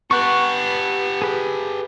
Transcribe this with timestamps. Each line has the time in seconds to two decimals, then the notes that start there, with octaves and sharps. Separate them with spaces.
0.11 B3 G4 A4 F#5 C#6
1.22 G#4 B4